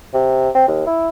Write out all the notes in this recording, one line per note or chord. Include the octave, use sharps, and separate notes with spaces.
C3
C4
D#2
E4